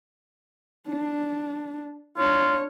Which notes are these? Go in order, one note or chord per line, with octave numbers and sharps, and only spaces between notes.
D4
D4 F4 C#5